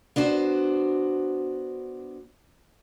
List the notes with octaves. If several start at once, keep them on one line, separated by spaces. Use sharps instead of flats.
B3 D4 F#4 C5